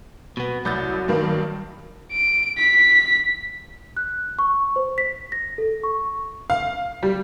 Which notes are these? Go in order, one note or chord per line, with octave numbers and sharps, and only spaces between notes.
B2 B3
C2 F#3 G6 A6
G2 D#3 A#3
D7
B6
F#6
C#6
C5
B6
A#6
A4
C#6
F5
G3